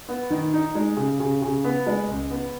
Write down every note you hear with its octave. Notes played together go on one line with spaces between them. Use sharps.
B3
D#3
D#4
G#3
C#3
C#3
C#3
B3
G#3
C#2
B3